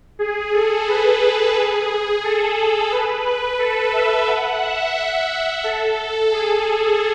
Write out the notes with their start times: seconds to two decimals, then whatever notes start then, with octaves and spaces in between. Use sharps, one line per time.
0.19 G#4
0.53 A4
0.88 B4
1.55 G#4
2.24 A4
2.91 B4
3.26 B4
3.59 A4
3.93 E5
4.27 F#5
4.62 E5
5.64 A4
6.32 G#4